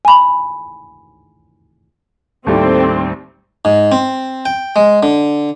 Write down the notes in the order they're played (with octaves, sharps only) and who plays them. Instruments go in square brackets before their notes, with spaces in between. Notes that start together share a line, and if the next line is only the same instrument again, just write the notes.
[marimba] G#5 B5
[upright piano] D#2 A2 G3 [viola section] C4 [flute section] A4 G5 D6
[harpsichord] G#2
C4
G5
G#3
D3